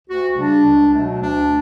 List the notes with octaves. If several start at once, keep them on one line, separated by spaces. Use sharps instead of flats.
D2 F#4
C#3 G3 D4
C#2
B2 F#3 A3
D2 D4